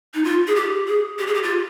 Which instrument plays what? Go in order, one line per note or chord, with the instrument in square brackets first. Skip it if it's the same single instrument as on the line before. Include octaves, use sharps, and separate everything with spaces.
[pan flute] D#4
F4
G#4
G4
G#4
G4
G#4
G4
F4